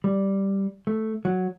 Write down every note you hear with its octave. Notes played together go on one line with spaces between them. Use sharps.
G3
A3
F#3